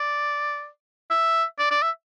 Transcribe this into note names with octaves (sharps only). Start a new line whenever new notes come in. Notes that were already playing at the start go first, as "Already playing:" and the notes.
Already playing: D5
E5
D5
D5
E5